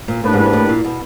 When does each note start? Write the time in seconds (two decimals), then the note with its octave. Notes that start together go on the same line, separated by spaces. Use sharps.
0.08 A#2
0.23 A2 A#3 D4 G4 B4
0.33 G#2
0.44 G#2
0.53 A2
0.69 A#2
0.84 B2